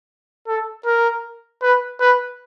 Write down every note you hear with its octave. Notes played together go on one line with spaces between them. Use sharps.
A4
A#4
B4
B4